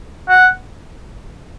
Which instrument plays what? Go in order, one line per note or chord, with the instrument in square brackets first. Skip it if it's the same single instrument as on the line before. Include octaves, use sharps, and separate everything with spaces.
[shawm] F#5